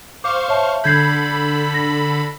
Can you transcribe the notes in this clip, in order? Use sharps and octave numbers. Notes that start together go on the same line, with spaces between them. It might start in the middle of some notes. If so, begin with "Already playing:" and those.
C5 F5 C#6 D6
C#5 E5 A5
D3 A4 B5 G6 G#6 C7
A#6